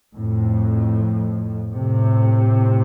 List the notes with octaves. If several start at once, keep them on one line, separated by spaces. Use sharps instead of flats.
F2 A2
A2 C3